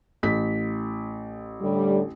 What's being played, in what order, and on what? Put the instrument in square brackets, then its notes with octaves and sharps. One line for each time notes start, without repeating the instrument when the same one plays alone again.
[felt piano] A1 B6
[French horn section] A2 D3 G3